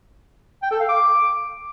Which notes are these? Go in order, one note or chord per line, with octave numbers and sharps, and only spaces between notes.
G5
A4
F5
D6